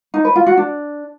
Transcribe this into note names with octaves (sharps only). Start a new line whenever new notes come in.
D#4
B4
F4
F#4
D4